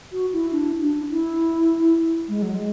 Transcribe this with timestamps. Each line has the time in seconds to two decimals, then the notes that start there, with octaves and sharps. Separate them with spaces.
0.12 F#4
0.33 E4
0.52 D4
0.81 D4
1.11 E4
2.28 G#3
2.42 F#3
2.55 G#3